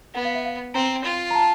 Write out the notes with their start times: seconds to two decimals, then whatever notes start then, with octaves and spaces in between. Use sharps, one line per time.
0.15 B3 F#5
0.25 F5
0.35 E5
0.45 F5
0.74 C4 A#5
1.05 F4
1.31 A#5
1.35 A5